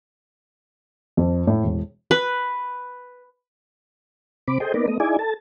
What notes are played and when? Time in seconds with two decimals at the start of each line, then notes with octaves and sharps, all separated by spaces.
1.17 F2
1.47 A2
1.64 E1
2.11 B4
4.48 C3 C4 B5 D6
4.60 G#4 A4 C5 D#5 G5
4.74 A#3 B3 D#4 A#4 B4 D5
4.88 A3 B3 D#5
5.00 D#4 E4 G#4 D5 G#5
5.19 A4 A5